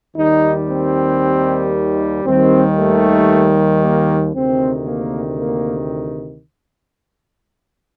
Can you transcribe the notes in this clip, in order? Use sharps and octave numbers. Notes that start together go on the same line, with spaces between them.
D#2 D#3 G3 D#4
C4
D#2 D#3 G3 C4
A3
A#3
D2 C3 D#3 C4
A#3
A#3